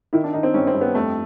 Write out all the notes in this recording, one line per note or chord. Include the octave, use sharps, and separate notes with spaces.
D#3 E4
D4
D#3 D#4
C4
G2 C#4
C4
G2
B3
F2 A3